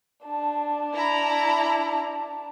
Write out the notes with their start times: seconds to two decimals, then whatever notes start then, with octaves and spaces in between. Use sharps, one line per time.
0.24 D4 A5
0.94 E4 A#5